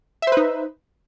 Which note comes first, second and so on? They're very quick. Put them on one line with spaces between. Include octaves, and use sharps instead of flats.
E5 C5 B4 D#4